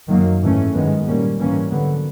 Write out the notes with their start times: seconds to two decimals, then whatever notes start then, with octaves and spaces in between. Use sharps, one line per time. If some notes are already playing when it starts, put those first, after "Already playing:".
0.10 F#2 D#3 F#3 A#3
0.43 G#2 E3 A3 C#4
0.75 G2 D#3 G#3 B3
1.07 A#2 G3 A#3 C#4
1.39 G#2 E3 G3 A#3 C#4
1.72 D3 F#3 B3